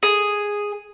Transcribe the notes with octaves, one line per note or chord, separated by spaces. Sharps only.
G#4